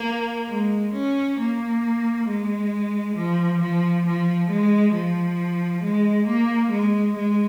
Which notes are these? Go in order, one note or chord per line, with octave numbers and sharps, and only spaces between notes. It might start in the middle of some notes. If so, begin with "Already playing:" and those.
Already playing: A#3
G#3
C#4
A#3
G#3
F3
F3
F3
G#3
F3
G#3
A#3
G#3
G#3